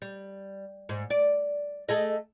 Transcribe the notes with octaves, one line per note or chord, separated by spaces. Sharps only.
G3
G#2
D5
A3 G#4 D#5